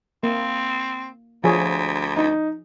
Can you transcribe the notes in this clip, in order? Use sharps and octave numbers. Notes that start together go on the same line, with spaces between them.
A#3 C4
D2 F3 G#4 C#5
D#4